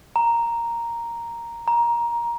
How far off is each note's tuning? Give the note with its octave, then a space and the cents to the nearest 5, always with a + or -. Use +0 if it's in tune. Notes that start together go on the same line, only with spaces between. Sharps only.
A#5 +0
A#5 +15